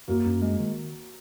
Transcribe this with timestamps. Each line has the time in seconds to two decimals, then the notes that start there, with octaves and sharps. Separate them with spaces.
0.08 F#2 F#3 A#3
0.25 F#2
0.42 G#3
0.60 D#3